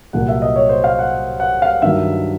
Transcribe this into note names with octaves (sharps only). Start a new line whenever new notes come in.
C2 A#2 F#3 F#5
E5
D#5
C#5
C5
F5
F#5
F#5
F5
G2 D#3 F#3 E5